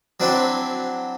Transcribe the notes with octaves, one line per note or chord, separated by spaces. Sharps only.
F#3 C4 D4 E4